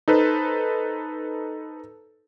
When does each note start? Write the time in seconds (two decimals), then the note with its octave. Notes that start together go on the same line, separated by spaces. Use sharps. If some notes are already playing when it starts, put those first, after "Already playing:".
0.08 D#4 A4 B4 C5